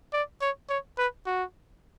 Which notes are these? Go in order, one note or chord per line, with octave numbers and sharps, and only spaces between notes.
D5
C#5
C#5
B4
F#4